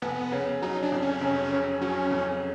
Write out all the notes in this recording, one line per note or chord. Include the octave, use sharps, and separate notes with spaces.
F1 B3
C#3
F#3 D#4
D4
F2
C#4
F1
C#3
F#3 C#4
F2